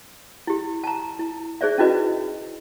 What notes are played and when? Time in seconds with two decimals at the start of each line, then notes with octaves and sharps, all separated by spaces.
0.47 E4 G4
0.84 A5 A#5
1.19 E4
1.61 D#4 G#4 C5 D5 E5
1.78 C#4 D#4 E4 F#4 B4 D#5